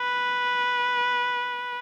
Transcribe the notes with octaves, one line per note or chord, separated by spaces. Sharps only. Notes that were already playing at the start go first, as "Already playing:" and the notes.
Already playing: B4